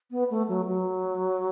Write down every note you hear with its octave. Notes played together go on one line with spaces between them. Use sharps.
B3
A3
F#3
F#3